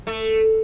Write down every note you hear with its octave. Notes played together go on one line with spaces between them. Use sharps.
A3